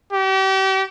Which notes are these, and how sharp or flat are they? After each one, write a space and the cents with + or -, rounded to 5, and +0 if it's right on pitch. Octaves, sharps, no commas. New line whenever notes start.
G4 -35